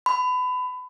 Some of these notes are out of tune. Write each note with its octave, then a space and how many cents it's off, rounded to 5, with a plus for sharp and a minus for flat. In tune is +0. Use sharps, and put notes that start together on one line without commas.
B5 +25